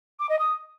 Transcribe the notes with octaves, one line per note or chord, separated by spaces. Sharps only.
D6
D#5
D#6